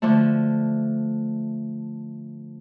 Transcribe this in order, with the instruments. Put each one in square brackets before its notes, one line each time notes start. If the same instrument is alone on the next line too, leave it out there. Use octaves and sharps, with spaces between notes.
[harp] D3 F3 A3